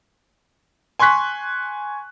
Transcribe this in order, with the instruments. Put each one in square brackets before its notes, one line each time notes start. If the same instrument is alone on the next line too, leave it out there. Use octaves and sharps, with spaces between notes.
[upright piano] G#5 C6 C#6 F#6 B6